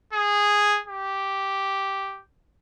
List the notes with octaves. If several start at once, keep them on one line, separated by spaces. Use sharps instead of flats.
G#4
G4